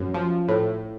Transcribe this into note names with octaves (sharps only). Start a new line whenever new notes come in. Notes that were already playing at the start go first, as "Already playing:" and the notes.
Already playing: F#2
F3
A2